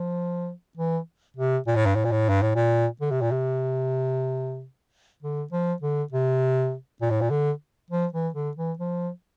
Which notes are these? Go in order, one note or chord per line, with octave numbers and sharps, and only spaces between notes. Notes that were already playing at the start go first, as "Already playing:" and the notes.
Already playing: F3
E3
C3
A#2
A2
G2
A2
A#2
A2
G2
A2
A#2
D3
C3
A#2
C3
D3
F3
D3
C3
A#2
A2
A#2
D3
F3
E3
D3
E3
F3